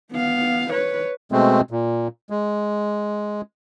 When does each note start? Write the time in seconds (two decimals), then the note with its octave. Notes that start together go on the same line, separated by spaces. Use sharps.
0.12 B3 F5
0.71 B4 C#5
1.32 B2 G#3 A3 C4
1.71 A#2
2.30 G#3